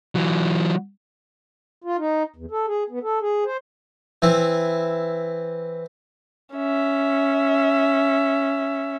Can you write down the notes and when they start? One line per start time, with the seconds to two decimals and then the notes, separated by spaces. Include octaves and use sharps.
0.15 E3 F#3
1.84 F4
1.98 D#4
2.36 E2
2.51 A4
2.67 G#4
2.90 B3
3.03 A4
3.21 G#4
3.45 C5
4.22 E3 C4 E4
6.55 C#4 E5